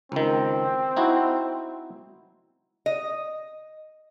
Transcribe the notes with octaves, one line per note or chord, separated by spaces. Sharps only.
C#2 D#3 C4
D#4 E4 F#4
D#5